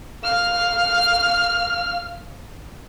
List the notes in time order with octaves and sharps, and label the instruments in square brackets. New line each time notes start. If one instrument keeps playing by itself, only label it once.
[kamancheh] F5 F6